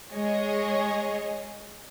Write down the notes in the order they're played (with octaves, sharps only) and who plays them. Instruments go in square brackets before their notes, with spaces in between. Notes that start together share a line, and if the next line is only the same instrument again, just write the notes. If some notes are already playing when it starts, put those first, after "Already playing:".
[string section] G#3 G#4 C#5 D#5